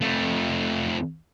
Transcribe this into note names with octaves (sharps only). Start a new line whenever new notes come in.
F2 A3